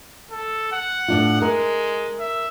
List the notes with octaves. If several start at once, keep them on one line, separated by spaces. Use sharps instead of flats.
A4
F#5
A2 D4 F4
G#3 A#4
E5